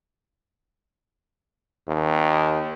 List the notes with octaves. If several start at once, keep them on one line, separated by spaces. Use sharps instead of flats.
D#2